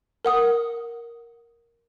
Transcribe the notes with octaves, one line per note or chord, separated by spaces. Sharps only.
A#4 F#5 D#6